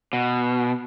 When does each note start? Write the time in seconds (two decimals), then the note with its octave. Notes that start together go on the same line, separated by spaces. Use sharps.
0.13 B2